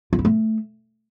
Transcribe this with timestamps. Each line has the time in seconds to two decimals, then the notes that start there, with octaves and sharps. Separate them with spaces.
0.13 F4
0.19 E4
0.25 A3